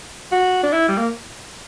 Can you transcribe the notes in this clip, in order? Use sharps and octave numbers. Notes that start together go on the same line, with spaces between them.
F#4
D4
E4
G3
A#3